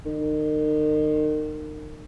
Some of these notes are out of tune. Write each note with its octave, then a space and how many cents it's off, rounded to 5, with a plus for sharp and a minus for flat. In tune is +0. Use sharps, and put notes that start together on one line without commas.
D#3 -35